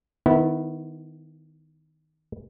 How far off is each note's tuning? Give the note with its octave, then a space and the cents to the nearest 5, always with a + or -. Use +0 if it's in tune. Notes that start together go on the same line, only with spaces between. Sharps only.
D#3 +0 B3 +20 E4 -20